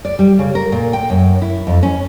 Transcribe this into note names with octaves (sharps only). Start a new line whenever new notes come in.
D5
G3
C#3
A#4
A#2
G5
F#2
E4
F2
C#4